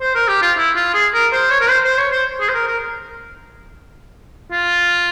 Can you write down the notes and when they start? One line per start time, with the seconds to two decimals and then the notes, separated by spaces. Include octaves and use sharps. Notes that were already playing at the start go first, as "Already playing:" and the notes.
0.01 C5
0.15 A#4
0.28 G4
0.42 F4
0.57 E4
0.76 F4
0.94 G#4
1.14 A#4
1.33 C5
1.51 C#5
1.61 A#4
1.70 C5
1.85 C5
1.98 C#5
2.12 C5
2.40 G#4
2.49 C5
2.54 A#4
2.68 A#4
4.52 F4